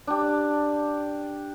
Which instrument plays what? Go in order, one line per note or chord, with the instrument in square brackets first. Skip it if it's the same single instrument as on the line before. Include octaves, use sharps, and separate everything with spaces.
[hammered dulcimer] D4 G4